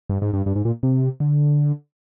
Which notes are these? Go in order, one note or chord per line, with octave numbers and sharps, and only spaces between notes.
G2
G#2
G2
G2
G#2
A#2
C3
D3